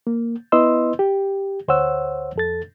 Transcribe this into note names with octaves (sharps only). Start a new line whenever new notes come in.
A#3
B3 E4 B4 D#5 C6 E6
G4
D2 C5 C#5 F#5 E6
F2 A4 A6